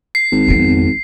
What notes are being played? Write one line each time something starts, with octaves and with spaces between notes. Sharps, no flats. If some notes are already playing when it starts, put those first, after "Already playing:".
C7
G#1
F2 B3